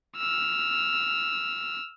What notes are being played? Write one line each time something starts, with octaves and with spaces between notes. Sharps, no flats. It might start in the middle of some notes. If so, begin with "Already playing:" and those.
E6 F6